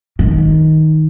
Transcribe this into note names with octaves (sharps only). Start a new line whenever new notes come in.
D#3